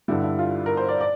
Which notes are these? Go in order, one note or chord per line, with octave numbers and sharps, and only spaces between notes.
G2 D3 G3 E4
E4
F4
A#4
C5
D5
D5